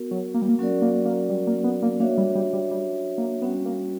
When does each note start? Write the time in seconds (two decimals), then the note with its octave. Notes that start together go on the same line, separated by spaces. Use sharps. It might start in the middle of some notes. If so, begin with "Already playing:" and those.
Already playing: B3 F#4 A#4
0.11 F#3
0.34 A#3
0.42 G3
0.49 A#3
0.59 F#3 C#4 F#4 A#4 D5
0.82 A#3
1.05 A#3
1.30 G3
1.47 A#3
1.64 B3
1.82 A#3
2.00 A#3 D4 F#4 C#5 E5
2.18 G3
2.35 G3
2.53 G3
2.71 G3
3.18 A#3
3.42 G3 B3 C#4 F#4
3.65 A#3